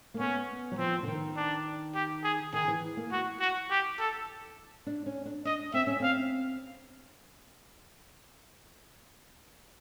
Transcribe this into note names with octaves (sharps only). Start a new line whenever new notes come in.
A#3
B3 C#4
F#3
F3 C4
D3
D#3
D4
G4
G#4
D#3 G#4
E3
A#3
F#4
F#4
G4
A4
D4
C#4
D4
D4 D#5
C4 E5
C#4
C4 F5